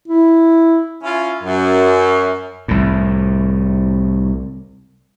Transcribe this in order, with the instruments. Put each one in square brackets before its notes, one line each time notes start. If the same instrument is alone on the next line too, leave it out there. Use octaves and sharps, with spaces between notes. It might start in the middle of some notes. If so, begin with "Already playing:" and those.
[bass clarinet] E4
[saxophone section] C#4 E4 F4
F#2
[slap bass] C2 A2